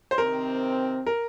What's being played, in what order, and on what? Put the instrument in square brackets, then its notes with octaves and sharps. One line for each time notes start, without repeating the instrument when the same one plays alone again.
[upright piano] C5
[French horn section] C3 D#3 C4 [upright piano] A#4
[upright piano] A#4